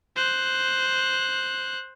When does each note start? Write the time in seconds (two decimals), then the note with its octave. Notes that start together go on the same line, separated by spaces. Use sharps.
0.16 C5 F#6